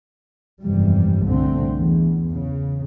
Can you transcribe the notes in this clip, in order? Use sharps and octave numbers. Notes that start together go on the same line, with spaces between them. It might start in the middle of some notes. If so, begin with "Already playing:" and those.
G1 F2 G#2 C3 E3 G3
C2 A#2 D3 A3 C4
E2
C#3